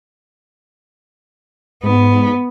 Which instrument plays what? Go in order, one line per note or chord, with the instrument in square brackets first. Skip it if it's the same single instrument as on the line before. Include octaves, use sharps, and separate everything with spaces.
[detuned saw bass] G#2 [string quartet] B3